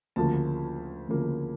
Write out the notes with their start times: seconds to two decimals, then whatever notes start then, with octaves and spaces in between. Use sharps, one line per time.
0.16 D2 C#3 F3 A#3 A5
1.09 D2 C#3 F3 A#3